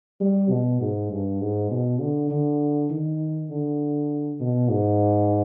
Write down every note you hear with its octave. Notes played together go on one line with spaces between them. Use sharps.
G3
B2
G#2
G2
G#2
B2
D3
D3
D#3
D3
B2
G#2